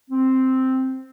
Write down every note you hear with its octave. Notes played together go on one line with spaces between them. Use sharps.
C4